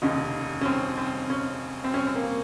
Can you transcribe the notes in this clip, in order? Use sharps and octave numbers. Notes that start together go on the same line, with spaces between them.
F1 D#2 C#3 D#4
C#4
C4
C4
C#4
C4
C#4
C4
A#3